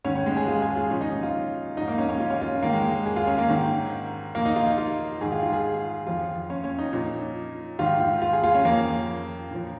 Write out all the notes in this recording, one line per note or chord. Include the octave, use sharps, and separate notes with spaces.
G#2 D#3 C#4
C#4
G#3
G#4
F4
G#4
F4
A#2 F3 C#4
D#4
F4
G#2 F3 D#4
A#3
C#4
C#4
F4
C#4
F4
G#2 D#3 A#3
G#3
G#4
F4
C#4
A#3
G#2 D#3
A#2 F3 A#3
D#4
F4
D#4
F4
G#2 D#3 G#4
F4
F4
G#4
F2 F3 F4
C#4
C#4
D#4
A#2 F3
G#2 D#3 F4
F4
F4
G#4
F4
C#4
F2 F3 A#3
A#2 F3